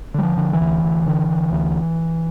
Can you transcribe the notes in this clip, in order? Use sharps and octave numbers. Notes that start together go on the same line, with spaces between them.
D3 G3
F3
D3
E3
D2
D2
D3
D3
D2